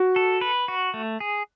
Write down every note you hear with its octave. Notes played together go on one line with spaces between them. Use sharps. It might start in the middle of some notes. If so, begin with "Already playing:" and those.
Already playing: F#4
A4
B4
F#4
A3
G#4